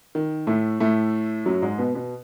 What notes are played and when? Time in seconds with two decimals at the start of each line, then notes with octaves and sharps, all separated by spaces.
0.15 D#3
0.47 A2 A3
0.80 A2 A3
1.46 F#2 F#3
1.62 G#2 G#3
1.78 B2 B3
1.94 B2 B3